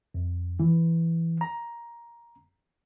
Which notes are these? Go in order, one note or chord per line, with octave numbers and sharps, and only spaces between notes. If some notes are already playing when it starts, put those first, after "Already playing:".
F2
E3
A#5